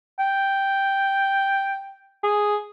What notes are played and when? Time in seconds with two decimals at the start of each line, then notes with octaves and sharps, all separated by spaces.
0.19 G5
2.23 G#4